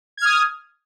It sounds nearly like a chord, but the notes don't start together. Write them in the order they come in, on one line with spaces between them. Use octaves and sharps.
G#6 F6 D#6